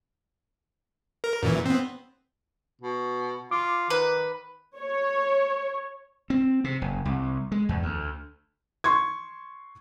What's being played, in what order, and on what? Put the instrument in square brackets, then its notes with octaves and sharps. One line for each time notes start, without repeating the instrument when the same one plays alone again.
[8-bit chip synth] A#4
F#2 A#2 E3
B3 C4
[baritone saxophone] B2
[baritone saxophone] F4 [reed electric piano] D6
[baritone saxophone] D#3 [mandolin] B4
[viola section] C#5
[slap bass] C4
C3
F#1
C2
G#3
E2
D2
[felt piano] C6 C#6 G#6